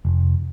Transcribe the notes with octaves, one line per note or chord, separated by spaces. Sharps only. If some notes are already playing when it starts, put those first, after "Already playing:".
F1